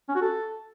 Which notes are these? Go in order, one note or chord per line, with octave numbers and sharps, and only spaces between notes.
C#4
F#4
A4